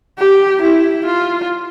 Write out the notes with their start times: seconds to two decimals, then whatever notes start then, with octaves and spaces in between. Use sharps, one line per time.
0.19 G4
0.62 E4
1.06 F4